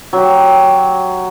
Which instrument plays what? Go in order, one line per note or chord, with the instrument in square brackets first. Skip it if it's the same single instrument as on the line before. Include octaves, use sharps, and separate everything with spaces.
[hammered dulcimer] F#3 G4